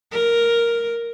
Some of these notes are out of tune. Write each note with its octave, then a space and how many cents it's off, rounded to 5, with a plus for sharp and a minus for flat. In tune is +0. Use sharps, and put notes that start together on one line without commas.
A#4 +0